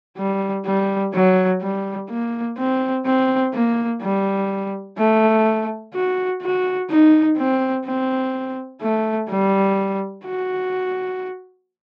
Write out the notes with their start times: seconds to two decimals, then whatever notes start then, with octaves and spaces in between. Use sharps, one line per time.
0.18 G3
0.66 G3
1.14 F#3
1.61 G3
2.09 A#3
2.58 C4
3.05 C4
3.54 A#3
4.01 G3
4.98 A3
5.94 F#4
6.42 F#4
6.90 D#4
7.38 C4
7.86 C4
8.81 A3
9.30 G3
10.26 F#4